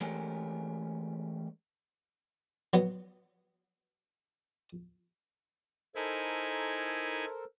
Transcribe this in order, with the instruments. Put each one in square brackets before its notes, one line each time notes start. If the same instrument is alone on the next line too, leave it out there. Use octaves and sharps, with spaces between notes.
[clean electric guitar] E3 G#3 A3 C#4 G4 A#4
[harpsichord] F#3 B3
[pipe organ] D#4 E4 G#5 [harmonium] A4 A#4 C5